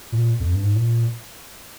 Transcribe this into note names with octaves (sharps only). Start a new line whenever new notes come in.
A#2
F2
G2
G#2
A#2